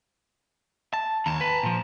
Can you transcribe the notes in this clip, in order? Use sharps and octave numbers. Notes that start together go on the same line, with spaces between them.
A5
D#2 A5 A#5
B4
A#2 F3